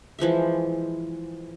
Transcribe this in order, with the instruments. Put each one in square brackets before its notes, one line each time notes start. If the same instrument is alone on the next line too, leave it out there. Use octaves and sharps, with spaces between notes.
[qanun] E3 F3 G#3 E5